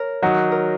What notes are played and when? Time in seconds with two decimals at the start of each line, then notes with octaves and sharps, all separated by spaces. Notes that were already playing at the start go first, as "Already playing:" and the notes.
Already playing: A#4 C#5
0.22 D#3 F#3 D#4 F#4
0.52 A#4